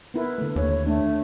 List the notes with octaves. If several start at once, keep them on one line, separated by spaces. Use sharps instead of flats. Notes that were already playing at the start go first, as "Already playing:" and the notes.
B3 E4 A#4 B4
D3 A3
D#2 A3 C#5
A3 D4